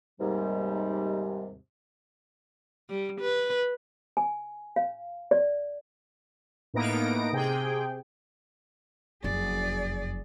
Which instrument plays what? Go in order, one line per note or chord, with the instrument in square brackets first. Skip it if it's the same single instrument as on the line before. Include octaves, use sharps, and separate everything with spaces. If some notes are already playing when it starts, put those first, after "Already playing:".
[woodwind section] D#2 G#2 C3 G3
[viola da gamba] G3
B4
[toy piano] G#5
F5
D5
[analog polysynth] A2 A#3 B3 D#4 A#6 D7
C3 G#4 G5
[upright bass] F#1 F2 [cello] G#4 D5